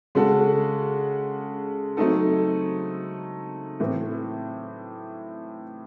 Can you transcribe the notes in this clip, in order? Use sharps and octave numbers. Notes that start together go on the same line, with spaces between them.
C#3 G#3 C#4 F#4 A4
F#3 A3 C4 D#4 A4
A2 E3 C4